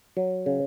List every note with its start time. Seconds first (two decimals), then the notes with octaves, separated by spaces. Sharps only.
0.17 F#3
0.46 C#3